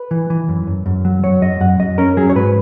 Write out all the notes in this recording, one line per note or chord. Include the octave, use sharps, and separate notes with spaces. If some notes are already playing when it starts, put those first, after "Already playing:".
Already playing: B4
E3
E3
F#2
F#2
F#2
F#3
F#3 C#5
F#2 D#5
F#2 F#5
F#2 D#5
C#4 A#4
F#3 G#4
C#5
G#2 B4